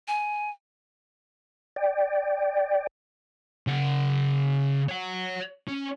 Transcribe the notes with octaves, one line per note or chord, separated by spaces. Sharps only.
G#5
D5 G5
C#3 F#5
C#5 F#5
C#4